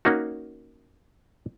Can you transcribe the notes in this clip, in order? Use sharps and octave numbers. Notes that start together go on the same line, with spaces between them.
A#3 C#4 D#4 F#4